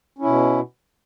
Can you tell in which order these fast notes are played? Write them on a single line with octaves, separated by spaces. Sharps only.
C#4 E4 B2